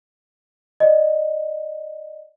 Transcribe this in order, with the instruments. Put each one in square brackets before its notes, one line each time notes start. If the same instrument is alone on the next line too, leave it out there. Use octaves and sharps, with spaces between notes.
[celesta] D5 D#5